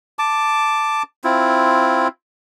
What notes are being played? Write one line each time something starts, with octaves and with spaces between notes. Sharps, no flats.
A5 D6
C4 E4 F4